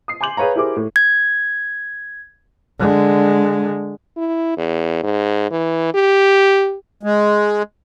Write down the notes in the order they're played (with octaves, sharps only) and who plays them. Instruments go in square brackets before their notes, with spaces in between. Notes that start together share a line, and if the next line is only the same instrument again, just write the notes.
[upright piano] D#6 C7
G#5 C6 D6 G6 F#7
G#4 B4 C#5 F5 A#5
E4 G4 G#4 A#4 C5 D6
A2
[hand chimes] G#6
[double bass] D3 G#3
[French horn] E4
E2
G#2
E3
G4
[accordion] G#3